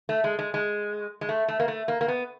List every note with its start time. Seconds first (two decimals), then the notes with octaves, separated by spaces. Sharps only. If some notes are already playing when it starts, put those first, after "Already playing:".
0.09 A3
0.24 G#3
0.39 G#3
0.54 G#3
1.21 G#3
1.29 A3
1.48 A3
1.60 A#3
1.68 A3
1.88 A#3
2.01 A#3
2.08 B3